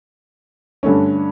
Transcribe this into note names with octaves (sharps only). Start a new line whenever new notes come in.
G2 D3 A3 C#4